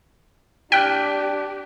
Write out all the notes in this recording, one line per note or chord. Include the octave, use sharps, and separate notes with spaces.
D4 G4 G5 F6 F#6 B6